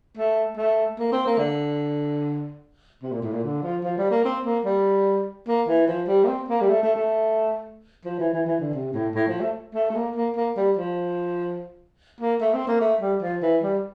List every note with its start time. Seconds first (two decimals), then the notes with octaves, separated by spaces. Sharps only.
0.17 A3
0.57 A3
0.99 A#3
1.12 C4
1.26 A#3
1.39 D3
3.03 C3
3.12 A#2
3.23 A2
3.32 A#2
3.44 D3
3.63 F3
3.84 F3
3.98 G3
4.11 A#3
4.25 C4
4.45 A#3
4.65 G3
5.48 A#3
5.68 E3
5.88 F3
6.08 G3
6.24 A#3
6.28 C4
6.49 A#3
6.61 G3
6.70 A3
6.83 A3
6.96 A3
8.05 F3
8.19 E3
8.33 E3
8.46 E3
8.60 D3
8.74 C3
8.94 A2
9.15 A2
9.28 F3
9.41 A3
9.75 A3
9.90 A3
9.96 A#3
10.16 A#3
10.36 A#3
10.57 G3
10.77 F3
12.21 A#3
12.41 A3
12.54 C4
12.67 A#3
12.81 A3
13.01 G3
13.22 F3
13.43 E3
13.63 G3